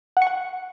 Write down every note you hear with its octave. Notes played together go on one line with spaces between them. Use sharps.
F#5
C#6
F#5